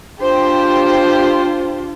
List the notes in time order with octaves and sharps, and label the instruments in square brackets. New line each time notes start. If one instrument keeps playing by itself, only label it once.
[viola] D4 F4 [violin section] G4 C5